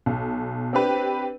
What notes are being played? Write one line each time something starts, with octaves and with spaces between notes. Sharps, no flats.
B1
C4 D4 G4 B4